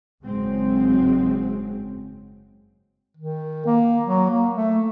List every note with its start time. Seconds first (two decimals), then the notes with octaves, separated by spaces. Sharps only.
0.23 F#1 G#2 C#3 F#3 G#3 C4
3.17 D#3
3.66 A#3
4.05 F#3
4.30 A#3
4.56 A3